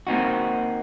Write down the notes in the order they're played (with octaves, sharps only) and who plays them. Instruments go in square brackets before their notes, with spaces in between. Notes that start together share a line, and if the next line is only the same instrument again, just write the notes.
[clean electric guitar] A#3 C4 D#4 F#4